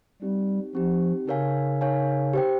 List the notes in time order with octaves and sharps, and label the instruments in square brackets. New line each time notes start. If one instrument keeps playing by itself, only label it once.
[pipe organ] G3 [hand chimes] C4 D#4 G4
[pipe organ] F3 [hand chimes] C4 D#4 G4
[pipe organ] C#3 [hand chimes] D#4 A#4 C#5 F5 G#5
[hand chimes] D#4 A#4 C#5 F5 G#5
G4 C5 G5